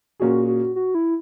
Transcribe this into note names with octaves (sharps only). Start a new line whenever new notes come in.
A#2 A#3 C#4 F#4 G#4
F#4
F#4
E4